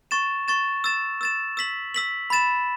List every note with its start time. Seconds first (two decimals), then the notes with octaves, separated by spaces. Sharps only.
0.11 C#6 A6 E7
0.48 C#6 A6 E7
0.84 E6 A6 E7
1.21 E6 A6 E7
1.57 E6 B6 F#7
1.94 E6 B6 F#7
2.30 B5 A6 E7